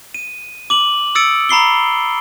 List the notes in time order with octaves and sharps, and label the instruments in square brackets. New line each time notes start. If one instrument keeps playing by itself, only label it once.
[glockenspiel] D#7
D6 F#7
D#6 E6 A6 C#7 D7
A#5 B5 C7 G7